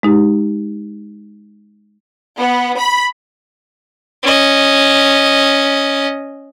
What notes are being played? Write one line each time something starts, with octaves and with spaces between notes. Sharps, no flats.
G#3 D#4 G4
B3
B5
C#4 D#5